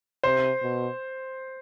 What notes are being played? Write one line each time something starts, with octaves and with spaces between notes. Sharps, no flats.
C3 C5
B2